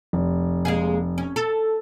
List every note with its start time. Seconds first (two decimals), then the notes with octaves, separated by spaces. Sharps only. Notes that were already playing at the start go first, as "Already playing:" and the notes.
0.13 F1
0.65 G#3 A#3 G#4
1.18 C#4
1.36 A4